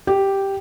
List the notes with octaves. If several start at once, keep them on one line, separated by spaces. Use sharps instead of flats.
G4